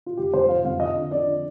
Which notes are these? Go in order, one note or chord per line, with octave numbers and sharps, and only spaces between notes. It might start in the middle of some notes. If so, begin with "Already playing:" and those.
F4
F1 G4
F1 C5
F2 F5
F1 F5
F2 D#5
D3
F2 D5
D3